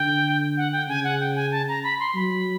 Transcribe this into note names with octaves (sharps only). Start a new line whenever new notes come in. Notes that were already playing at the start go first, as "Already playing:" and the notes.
Already playing: D3 G5
F#5
G5
C#3 G#5
F#5
G5
G#5
A5
A#5
B5
C6
F#3 B5